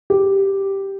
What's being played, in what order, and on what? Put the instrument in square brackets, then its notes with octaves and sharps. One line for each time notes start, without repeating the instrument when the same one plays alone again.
[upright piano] G4